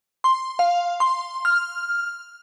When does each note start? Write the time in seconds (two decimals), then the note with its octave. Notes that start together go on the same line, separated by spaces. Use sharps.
0.24 C6
0.59 F5
1.00 C6
1.45 F6